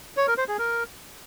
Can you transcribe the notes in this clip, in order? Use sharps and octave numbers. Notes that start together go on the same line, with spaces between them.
C#5
A#4
C5
G#4
A#4